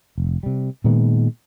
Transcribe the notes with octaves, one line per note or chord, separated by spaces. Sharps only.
F1
C3 G3
A#2 D#3 G#3 B3